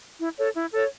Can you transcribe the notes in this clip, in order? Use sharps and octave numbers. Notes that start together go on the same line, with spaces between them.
E4
A4 C#5
E4
A4 C#5